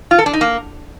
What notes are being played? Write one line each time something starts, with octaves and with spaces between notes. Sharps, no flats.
F4
A4
D4
D#4
A#3